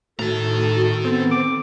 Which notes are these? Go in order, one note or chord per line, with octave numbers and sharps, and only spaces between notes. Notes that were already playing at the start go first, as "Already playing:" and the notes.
A2 D#3 F#4 A4 A#5
B3 C4 A4
D6